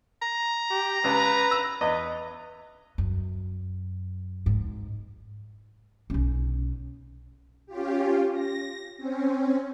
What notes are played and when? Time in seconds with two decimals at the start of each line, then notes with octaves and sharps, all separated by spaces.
0.22 A#5
0.70 G4
1.04 C#2 B4
1.51 E6
1.81 E2 B4 D#5
2.98 F#2
4.46 G#2
6.10 B1 C#4
7.67 C#4 F4 G4
8.33 A#6
8.98 C4 C#4